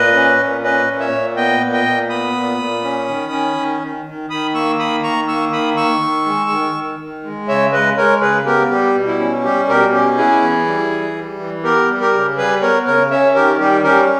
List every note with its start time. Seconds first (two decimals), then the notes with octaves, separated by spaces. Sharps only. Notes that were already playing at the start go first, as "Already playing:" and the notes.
Already playing: A#2 B4 D#5
0.14 C#4
0.39 A#2
0.63 C#4 B4 D#5
0.88 A#2
1.00 C#5 E5
1.12 A#2
1.36 B3 D#5 G5
1.61 A#2
1.73 D#5 G5
1.85 A#2
2.10 B3 B5 D#6
2.34 A#2
2.59 A#2
2.84 C#4
3.08 D#3
3.32 C#4
3.57 D#3
3.82 D#3
4.06 D#3
4.30 D#3 B5 D#6
4.54 A#3 C#6 E6
4.79 D#3 B5 D#6
5.03 D#3 A#5 C#6
5.28 A#3 C#6 E6
5.52 D#3 B5 D#6
5.77 D#3 C#6 E6
6.01 D#3
6.26 G#3
6.50 D#3
6.74 D#3
7.00 D#3
7.24 G#3
7.48 C#3 C#5 E5
7.73 G#3 B4 D#5
7.97 G#3 A#4 C#5
8.21 C#3 G#4 B4
8.46 B3 G4 A#4
8.71 G3 G4
8.95 B2
9.07 E4
9.20 C#4
9.44 G3 G4
9.68 B2 G4 A#4
9.92 C#4 G4
10.17 B3 E4 G#4
10.42 E3
10.66 G3
10.91 E3
11.15 G3
11.39 E3
11.64 B3 G4 A#4
11.88 G3
12.01 G4 A#4
12.13 C#3
12.37 G3 G#4 B4
12.61 B3 A#4 C#5
12.86 C#3 A#4 C#5
13.11 C#4 C#5 E5
13.35 D#3 G4 A#4
13.60 G3 G4
13.84 C#4 G4 A#4